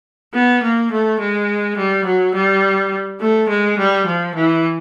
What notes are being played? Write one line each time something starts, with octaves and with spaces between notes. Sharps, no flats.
B3
A#3
A3
G#3
G3
F#3
G3
A3
G#3
G3
F3
E3